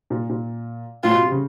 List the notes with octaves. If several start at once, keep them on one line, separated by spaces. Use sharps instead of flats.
A#2
A#2
A2 F4
B2
C3
C#3